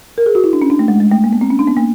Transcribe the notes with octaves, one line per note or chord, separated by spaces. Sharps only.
A#4
G#4
F#4
E4
D4
C#4
D4
A3
G#3
G#3
A3
A#3
B3
C4
C#4
D4
B3
A#3